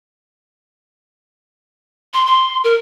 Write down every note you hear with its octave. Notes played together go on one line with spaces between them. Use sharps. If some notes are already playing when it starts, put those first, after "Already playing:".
C6
C6
A#4